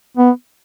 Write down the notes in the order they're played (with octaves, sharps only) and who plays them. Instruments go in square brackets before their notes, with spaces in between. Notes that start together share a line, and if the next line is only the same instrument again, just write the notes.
[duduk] B3